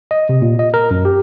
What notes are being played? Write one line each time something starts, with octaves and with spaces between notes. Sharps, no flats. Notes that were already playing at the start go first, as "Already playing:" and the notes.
D#5
C3
A#2
D#5
A#4
F#2
G4